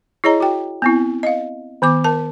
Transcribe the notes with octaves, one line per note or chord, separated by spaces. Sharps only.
E4 G#4 C#5 D#5 A#5
F#4 G5
B3 C4 E4
D#5 F5
D#3 B3 D6
A#4 A5